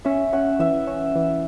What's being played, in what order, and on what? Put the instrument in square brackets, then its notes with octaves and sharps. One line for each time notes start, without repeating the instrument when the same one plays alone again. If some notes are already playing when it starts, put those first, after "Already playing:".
[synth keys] C#4 [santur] E5
[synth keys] C#4 [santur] F#5
[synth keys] E3 [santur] E5
[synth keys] C#4
E3